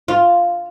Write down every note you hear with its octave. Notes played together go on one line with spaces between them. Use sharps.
F4